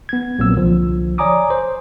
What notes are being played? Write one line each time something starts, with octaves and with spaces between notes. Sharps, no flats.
B3 G#6
A#1 A#2 F#3 A#3 C4 E6
C2 D3 F3
C#5 D5 G#5 A#5 D6 D#6
C5